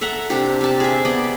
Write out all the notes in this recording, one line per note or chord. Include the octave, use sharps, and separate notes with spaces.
A4 E5 F#5 A#5
C3 D4 G4
C3 A5
G#4 E5
B3 D5 D#5 B5